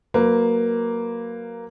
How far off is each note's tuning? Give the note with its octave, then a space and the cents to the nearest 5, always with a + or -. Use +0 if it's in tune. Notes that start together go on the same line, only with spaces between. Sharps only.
F#3 -5 A#3 +0 B4 +15